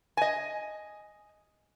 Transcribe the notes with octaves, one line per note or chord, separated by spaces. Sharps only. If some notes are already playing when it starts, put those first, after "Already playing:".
D#5 G#5